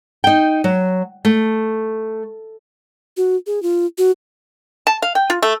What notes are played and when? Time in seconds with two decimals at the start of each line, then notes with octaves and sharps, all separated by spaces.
0.24 D#4 G5
0.64 F#3
1.25 A3
3.17 F#4
3.47 G#4
3.62 F4
3.98 F#4
4.87 A5
5.02 F5
5.15 G5
5.30 F4
5.42 A3